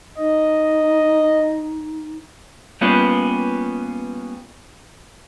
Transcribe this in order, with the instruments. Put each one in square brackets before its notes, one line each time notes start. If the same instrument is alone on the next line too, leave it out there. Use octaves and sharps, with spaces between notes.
[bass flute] D#4 [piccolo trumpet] D#5
[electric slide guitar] G3 A#3 B3 C#4 F4 B4